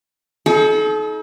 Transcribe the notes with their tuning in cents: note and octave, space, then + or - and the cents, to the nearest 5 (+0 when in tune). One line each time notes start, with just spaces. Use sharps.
D#4 +25 A4 -40